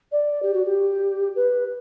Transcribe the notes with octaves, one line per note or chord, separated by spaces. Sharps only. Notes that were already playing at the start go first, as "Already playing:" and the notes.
D5
G4
F#4
G4
B4